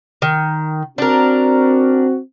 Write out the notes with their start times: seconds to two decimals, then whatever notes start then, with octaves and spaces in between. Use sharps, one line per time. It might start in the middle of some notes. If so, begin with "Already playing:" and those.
0.22 D#3
0.98 C4 D4 F#4 A#4